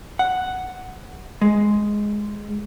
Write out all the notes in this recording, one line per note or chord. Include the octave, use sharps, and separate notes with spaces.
F#5
G#3